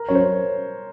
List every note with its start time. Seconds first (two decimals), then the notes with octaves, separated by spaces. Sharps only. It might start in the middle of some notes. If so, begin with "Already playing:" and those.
Already playing: A#4
0.09 F#2 C#5
0.15 C5